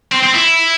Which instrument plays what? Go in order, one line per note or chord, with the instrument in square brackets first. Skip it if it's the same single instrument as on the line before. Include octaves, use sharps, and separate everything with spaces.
[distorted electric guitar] C4
C4
E4